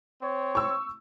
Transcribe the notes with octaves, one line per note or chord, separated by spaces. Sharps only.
C4 C#5
C#6 E6